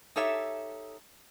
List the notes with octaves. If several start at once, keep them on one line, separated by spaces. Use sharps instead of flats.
D#4 G4 A4 C#5 E5